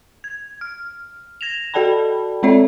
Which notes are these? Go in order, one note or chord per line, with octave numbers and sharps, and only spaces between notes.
G#6
F6
G#6 A#6 E7 F7
F#4 A4 D5 G5 A5 B5
G#3 C4 A4 C#5 D5 E5